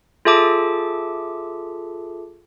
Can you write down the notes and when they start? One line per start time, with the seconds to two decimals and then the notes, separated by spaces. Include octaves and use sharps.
0.25 F4 G#4 A4 E5 A5 D6